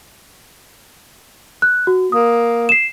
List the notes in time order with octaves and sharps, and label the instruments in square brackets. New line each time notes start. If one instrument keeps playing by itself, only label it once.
[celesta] F#6
F#4
[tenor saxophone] A#3 [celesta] D#6
[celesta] C7 E7